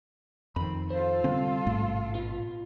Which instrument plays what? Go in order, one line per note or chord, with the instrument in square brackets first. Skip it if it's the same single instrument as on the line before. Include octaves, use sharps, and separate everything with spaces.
[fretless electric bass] F2 D#3 [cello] C4 [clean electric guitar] B5
[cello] F4 A4 [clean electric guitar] C5
[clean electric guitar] C2 [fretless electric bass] D3 C4
[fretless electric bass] A1 G#2 A3
[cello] B2 [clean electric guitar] F4